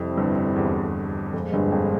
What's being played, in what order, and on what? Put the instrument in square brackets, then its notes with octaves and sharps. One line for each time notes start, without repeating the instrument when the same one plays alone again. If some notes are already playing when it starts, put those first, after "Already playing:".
Already playing: [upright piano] F2 [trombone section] C3 G3 C4 E4
[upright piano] G1 G2
E2
[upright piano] F2 [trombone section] A#2 F3 G#3
[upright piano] G1 G2
F2